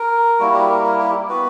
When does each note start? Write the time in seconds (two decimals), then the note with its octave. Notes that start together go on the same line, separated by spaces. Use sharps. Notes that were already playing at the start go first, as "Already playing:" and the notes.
Already playing: A#4
0.40 G3 A#3 E4 F#4
0.54 G4
0.70 A#4
0.84 A#4
0.99 G4
1.29 B3 F#4 B4